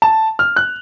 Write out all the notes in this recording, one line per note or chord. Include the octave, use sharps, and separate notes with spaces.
A5
F6
F#6